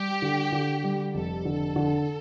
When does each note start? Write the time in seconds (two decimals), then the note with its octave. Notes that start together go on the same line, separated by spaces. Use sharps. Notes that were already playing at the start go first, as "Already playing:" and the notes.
Already playing: G3 G4
0.22 D3
0.52 D3
0.84 G3
1.14 F1 A4
1.45 D3
1.76 D3